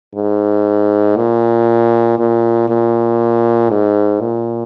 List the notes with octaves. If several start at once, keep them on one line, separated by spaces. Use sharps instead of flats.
G#2
A#2
A#2
A#2
G#2
A#2